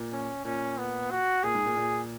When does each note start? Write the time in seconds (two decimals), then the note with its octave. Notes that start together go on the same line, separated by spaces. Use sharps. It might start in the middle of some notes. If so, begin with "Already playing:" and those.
Already playing: A#2
0.12 C#4
0.45 A#2 C#4
0.78 B3
1.11 F#4
1.44 A#2 G#4
1.55 G#2
1.65 A#2
1.77 A#2